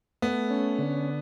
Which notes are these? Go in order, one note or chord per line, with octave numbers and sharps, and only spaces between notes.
A3 B3
C#4
D3